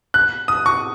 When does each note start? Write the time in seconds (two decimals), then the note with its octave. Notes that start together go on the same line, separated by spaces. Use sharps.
0.14 F#6
0.48 D#6
0.66 C#6